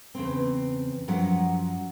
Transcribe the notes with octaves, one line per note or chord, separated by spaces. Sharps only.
E2 C#3 C4
F#2 F3 F#3 F#5